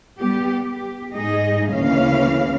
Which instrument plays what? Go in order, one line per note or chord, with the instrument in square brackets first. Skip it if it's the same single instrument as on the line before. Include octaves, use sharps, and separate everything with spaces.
[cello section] G3 B3 G4
G4
G#2 G#3 D#4 G#4 D#5
D2 C#3 E3 A#3 C#4 F5